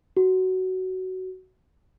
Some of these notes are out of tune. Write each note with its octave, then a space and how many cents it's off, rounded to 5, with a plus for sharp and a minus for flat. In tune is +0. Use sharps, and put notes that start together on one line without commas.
F#4 +15